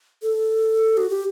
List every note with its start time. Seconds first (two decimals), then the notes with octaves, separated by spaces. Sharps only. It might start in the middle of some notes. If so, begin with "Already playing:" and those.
0.22 A4
0.97 F#4
1.10 G4